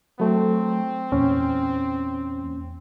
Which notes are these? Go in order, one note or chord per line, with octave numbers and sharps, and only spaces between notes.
F#3 A3 C4
E2 A#2 C#4